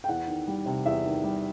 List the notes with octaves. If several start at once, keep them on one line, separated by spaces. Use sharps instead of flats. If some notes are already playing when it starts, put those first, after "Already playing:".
G5
E2 F#5
D#3
G3
C3
E2 E5
D#3
G3